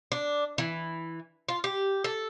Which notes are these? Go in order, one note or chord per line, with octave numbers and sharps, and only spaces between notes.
D4
E3
F4
G4
A4